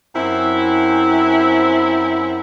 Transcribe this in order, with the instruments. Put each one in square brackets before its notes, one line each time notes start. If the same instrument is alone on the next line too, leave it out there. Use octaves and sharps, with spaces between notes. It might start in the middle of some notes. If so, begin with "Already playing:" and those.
[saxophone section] F#2 C4 E4